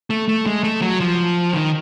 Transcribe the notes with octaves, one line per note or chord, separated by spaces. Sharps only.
A3
A3
G#3
A3
F#3
F3
D#3